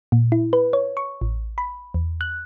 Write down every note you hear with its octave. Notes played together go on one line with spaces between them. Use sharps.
A#2
E4
B4
C#5
C#6
A1
B5
E2
F#6